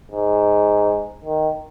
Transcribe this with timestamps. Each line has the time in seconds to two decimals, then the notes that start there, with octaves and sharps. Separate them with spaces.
0.12 G#2
1.24 D#3